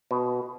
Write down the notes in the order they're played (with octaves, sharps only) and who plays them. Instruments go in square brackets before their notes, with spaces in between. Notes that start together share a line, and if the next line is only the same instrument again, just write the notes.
[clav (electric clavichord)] B2